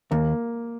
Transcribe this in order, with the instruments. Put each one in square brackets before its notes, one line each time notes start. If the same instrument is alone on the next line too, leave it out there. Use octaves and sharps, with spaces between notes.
[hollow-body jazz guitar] D#2 [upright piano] A#3